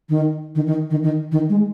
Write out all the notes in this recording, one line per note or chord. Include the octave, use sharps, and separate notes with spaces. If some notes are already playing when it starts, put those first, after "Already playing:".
D#3
D#3
D#3
D#3
D#3
D#3
G#3